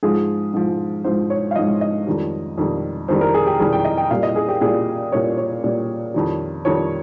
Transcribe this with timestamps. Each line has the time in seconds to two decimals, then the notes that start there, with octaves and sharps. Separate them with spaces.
0.03 G#2 F3 G#4
0.54 G#2 F3
1.04 G#2 F3 C5
1.30 C#5
1.51 F5
1.56 G#2 F3 D#5
1.81 D#5
2.07 F2 D#3 G3
2.58 F2 D#3 G3
3.08 F2 D#3 G3 C5
3.21 A#4
3.34 G#4
3.46 G4
3.60 F2 D#3 G3 G#4
3.73 G5
3.85 D#5
3.97 G5
4.11 A#2 G3 F5
4.23 D#5
4.36 G#4
4.49 G4
4.61 A#2 G3 G#4
5.12 A#2 G3 C#5
5.38 C#5
5.63 A#2 G3
6.14 F2 D#3 G3
6.65 F2 D#3 G3 C#5